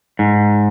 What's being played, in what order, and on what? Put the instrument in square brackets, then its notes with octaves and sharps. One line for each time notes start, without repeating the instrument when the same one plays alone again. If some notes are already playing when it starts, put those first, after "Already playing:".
[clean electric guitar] G#2